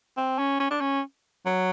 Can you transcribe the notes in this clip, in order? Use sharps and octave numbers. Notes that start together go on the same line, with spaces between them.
C4
C#4
C#4
D4
C#4
F#3